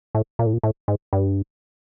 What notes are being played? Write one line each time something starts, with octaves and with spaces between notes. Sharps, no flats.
A2
A#2
A2
A#2
A2
G#2
G2